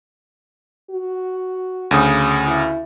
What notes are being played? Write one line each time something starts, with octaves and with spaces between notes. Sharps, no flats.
F#4
D2 C#3 D#6
E4